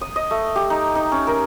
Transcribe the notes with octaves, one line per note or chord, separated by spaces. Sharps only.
D#6
D#5
A3
G4
D#4
D#4
C#4
A#4